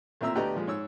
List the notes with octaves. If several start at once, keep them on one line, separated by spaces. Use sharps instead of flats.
A1 A#2 C4 E5 A#5 E6
D2 B3 G4 D5 D#5 A#5
A#2 F3 G#3
G#2 C#5 E6